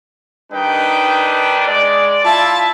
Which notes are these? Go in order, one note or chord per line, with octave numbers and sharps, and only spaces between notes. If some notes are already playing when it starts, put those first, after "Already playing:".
D#3 G3 D4 D#4 B4 G5
G#3 D5
E4 F4 E5 A5